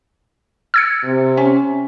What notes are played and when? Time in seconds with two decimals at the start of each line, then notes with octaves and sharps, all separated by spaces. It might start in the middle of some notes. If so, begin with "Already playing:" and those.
0.74 E6 G#6 C#7
1.04 C3
1.37 C#4